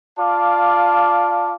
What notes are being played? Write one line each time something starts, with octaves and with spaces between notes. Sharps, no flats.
F4 D5 F5 A5 D6